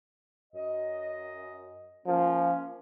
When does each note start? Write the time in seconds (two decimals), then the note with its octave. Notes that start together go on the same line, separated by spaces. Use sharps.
0.54 F#2 D#5
2.07 F3 A#3 C#4